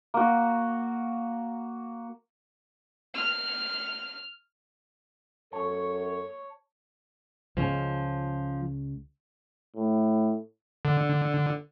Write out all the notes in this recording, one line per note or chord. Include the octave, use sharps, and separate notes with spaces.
A#3 F#4
F6
F#2 A4 C#5 A5 C#6
C#2 C#3 F3 C#4
A2
D3